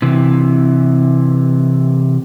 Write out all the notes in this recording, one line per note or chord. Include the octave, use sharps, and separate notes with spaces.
C3 E3